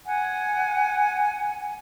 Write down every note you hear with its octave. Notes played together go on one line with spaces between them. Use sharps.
F#5 G#5